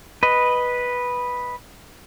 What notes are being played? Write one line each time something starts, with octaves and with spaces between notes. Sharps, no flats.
B4 D#5